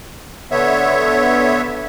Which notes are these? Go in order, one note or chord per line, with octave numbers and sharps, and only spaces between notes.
D3 B3 C#5 E5